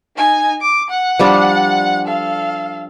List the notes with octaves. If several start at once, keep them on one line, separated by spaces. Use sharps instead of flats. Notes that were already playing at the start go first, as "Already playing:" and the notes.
D#4 G#5
D6
F#5
F3 G3 D4
A4 F5